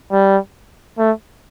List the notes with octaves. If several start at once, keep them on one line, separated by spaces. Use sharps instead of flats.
G3
A3